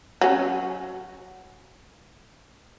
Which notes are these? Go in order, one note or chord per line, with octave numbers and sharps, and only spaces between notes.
F#3 C#4